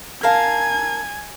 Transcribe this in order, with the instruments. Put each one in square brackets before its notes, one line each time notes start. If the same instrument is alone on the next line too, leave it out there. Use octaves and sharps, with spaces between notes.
[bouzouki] A#4 F5 A5 [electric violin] G#5 G#6